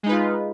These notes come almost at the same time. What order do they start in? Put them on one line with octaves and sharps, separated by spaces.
G#3 D#4 B4 F4